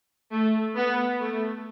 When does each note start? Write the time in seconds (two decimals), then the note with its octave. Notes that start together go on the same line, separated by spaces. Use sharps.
0.32 A3
0.76 B3
1.20 A3